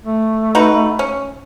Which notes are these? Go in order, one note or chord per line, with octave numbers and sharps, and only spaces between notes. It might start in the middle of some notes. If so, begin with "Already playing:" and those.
A3
D#4 F#4 B4
C#4